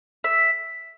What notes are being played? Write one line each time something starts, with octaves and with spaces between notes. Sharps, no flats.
E5